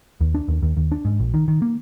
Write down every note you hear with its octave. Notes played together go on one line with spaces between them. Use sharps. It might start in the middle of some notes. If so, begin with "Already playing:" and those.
D#2
D4
D#2
D#2
D#2
D4
G#2
A#1
D#3
D#3
A#3